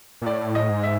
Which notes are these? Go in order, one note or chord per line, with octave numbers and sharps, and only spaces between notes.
A#2
A2 D5
D#5
G#2
E5